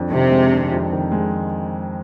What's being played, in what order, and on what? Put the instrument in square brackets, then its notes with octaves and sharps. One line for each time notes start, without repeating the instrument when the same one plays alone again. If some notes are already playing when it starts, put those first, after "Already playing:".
Already playing: [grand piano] F2 D4
[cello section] C3 [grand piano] D#3
[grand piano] G#3
D4
F2
D#3
G#3